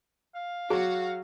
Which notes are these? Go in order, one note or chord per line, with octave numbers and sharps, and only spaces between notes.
F5
F#3 F#4 G#4